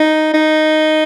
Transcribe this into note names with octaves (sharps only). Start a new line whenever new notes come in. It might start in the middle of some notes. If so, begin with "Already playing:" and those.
Already playing: D#4
D#4